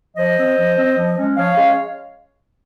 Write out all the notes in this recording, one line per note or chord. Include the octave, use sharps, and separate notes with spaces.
F3 C5 D#5
C4
F3
C4
F3
G#3 C#4
F3 C#5 F5
G#3 C#4